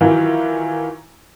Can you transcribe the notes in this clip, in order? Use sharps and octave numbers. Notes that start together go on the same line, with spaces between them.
D#3 E3 F#3 E4 F4